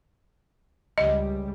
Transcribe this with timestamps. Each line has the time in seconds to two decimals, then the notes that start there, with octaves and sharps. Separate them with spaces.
0.98 C#2 G3 D#5